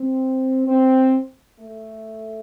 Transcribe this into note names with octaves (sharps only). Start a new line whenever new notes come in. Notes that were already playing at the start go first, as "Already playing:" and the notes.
Already playing: C4
C4
A3